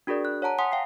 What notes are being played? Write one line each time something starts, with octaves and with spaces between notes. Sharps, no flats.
D4 F#4 G#4 A#4 D5
F#6
C#5 F#5 A5 A#5
F#5 G#5 C6 D#6 B6
F5 G5 C7